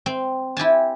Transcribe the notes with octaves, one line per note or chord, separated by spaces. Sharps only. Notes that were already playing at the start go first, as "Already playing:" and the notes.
C4
E4 G4 G#5 A5